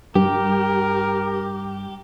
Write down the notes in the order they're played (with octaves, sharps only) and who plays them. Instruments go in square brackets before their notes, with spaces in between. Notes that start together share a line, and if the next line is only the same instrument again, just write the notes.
[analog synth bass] G2 [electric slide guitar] G4 [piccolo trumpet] A#4